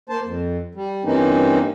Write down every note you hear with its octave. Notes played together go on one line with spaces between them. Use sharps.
A#3 C5 A5
F2
G3
G2 E3 A#3 C4 C#4 D#4